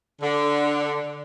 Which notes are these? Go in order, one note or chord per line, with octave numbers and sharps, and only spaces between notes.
D3